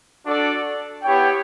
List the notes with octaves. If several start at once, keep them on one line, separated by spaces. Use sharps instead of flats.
D4 F#4 A4 D5
B3 E4 G4 C#5 G5